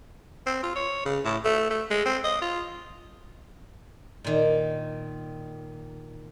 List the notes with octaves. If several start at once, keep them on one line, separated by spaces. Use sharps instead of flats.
C4
F4
C#5
C#3
A2
A3
A3
G#3
C4
D#5
F4
A#2 D#3